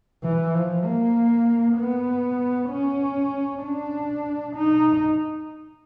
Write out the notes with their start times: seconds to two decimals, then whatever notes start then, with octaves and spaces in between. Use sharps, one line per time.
0.24 E3
0.55 F3
0.84 A#3
1.78 B3
2.70 C#4
3.64 D4
4.56 D#4